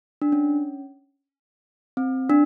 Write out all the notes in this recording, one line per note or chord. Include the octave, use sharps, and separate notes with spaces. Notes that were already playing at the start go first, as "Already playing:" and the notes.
D4
C#4
C4
D4